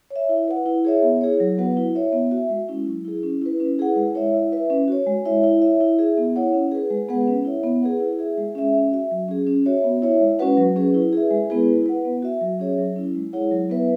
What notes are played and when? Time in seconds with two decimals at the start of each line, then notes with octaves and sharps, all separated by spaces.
0.10 C#5
0.16 E5
0.29 E4
0.48 B4 F#5
0.66 E4
0.85 G#4 C#5 E5
1.02 B3
1.21 E4 G#4 C#5
1.40 F#3
1.58 B3 F#4 B4 F#5
1.77 E4
1.95 C#5 E5
2.12 B3
2.31 F#4 E5
2.50 G#3
2.68 C#4 E4
2.87 F#3
3.05 E4 G#4
3.23 C#4
3.41 E4 B4
3.60 C#4
3.79 E4 G#4 B4 F#5
3.96 G#3
4.14 E4 C#5 E5
4.34 E4
4.52 B4 E5
4.70 C#4
4.88 F#4 C#5
5.07 G#3
5.25 E4 C#5 E5
5.43 E4
5.62 C#5 E5
5.81 E4
5.99 G#4 E5
6.17 B3
6.36 E4 C#5 F#5
6.53 C#4
6.71 G#4 B4
6.90 G#3
7.09 B3 G#4 B4 F#5
7.28 C#4
7.45 E4 C#5 E5
7.63 B3
7.82 G#4 B4 F#5
8.00 E4
8.19 G#4 E5
8.38 G#3
8.55 C#4 G#4 E5
8.73 C#4
8.92 F#4 E5
9.11 F#3
9.29 C#4 G#4
9.47 C#4
9.66 F#4 C#5 E5
9.84 B3
10.02 E4 C#5 E5
10.20 G#3
10.39 C#4 F#4 B4 F#5
10.57 F#3
10.76 C#4 G#4 B4
10.94 E4
11.13 G#4 B4 E5
11.31 G#3
11.50 B3 E4 G#4 B4
11.68 E4
11.86 B4 F#5
12.05 B3
12.22 F#4 E5
12.41 F#3
12.60 C#4 G#4 C#5 E5
12.78 F#3
12.96 C#4 E4
13.15 G#3
13.33 E4 G#4 C#5 F#5
13.51 F#3
13.70 B3 E4 B4 E5